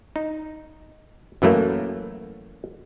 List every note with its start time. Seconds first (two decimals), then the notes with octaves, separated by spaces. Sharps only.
0.16 D#4
1.42 F#2 E3 F#3 A3 A#3